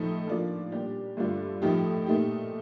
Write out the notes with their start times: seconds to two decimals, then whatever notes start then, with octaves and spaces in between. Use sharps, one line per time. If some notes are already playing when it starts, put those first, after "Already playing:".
Already playing: A2 F3 A3 D#4
0.27 F3 A#3 D4 F4
0.72 A#2 G3 D4 G4
1.17 G2 D3 A3 D4 F4
1.62 A2 F3 A3 D#4 G4
2.06 A#2 A3 D#4 G4